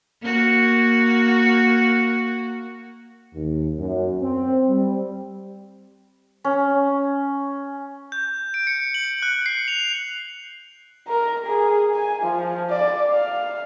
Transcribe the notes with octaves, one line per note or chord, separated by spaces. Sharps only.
A#3 F#4
D#2
F#2
C4
G3
C#4
G6
D7
C#7
F#7
F#6
C7
F7
A#4
G#4
G#5
F3
D5
F5